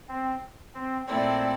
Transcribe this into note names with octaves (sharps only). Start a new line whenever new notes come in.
C4
C4
A#2 A3 C4 E4 A4 D5